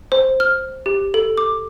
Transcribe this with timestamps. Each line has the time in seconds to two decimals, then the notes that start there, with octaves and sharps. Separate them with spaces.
0.12 C5
0.40 F6
0.86 G4
1.14 A4
1.37 D6